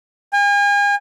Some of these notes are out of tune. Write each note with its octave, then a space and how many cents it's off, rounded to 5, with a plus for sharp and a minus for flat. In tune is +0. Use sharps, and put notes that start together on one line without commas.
G#5 -40